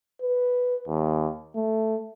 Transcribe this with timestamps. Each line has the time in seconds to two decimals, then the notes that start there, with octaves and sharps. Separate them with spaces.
0.22 B4
0.88 D#2
1.55 A3